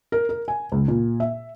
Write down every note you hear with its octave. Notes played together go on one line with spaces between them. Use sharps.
A#4
A#4
G#5
C#2
A#2
E5